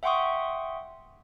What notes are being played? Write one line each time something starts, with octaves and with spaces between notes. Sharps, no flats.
E5 F#5 G5 C6 C#6 D#6